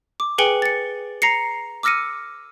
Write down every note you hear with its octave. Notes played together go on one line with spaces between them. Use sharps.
D6
G#4 B4 G5 G#5 C#7 G7
A6 C#7
A#5 A#6 C7 C#7
D6 E6 F6 A#6 C#7 D#7